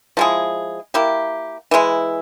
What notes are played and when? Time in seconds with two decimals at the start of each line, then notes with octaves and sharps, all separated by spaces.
0.17 F3 G#3 E4 G#4
0.94 A#3 E4 G4
1.71 E3 G#3 E4